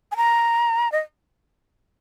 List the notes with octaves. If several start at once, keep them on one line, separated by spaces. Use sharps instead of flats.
G#5
A#5
D#5